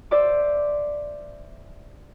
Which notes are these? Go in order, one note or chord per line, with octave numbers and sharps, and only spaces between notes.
C5 D5 E5 D6